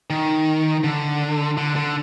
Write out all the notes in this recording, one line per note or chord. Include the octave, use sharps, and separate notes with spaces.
D#3
D3
D3
D3